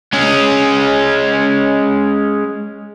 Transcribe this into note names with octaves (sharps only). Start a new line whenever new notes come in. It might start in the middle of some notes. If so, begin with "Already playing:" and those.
G#3 C#4